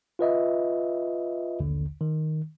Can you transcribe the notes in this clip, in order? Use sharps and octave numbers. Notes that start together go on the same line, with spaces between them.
F4 B4 D#5 E5
A#1 D#2 D3
D#3